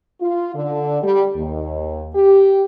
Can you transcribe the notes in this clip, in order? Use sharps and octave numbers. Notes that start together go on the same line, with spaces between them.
F4
D3
G3
D#2
G4